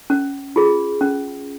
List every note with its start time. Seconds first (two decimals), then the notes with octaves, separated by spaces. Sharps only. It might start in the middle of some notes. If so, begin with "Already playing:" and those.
0.10 C#4
0.56 F4 G#4
1.01 C#4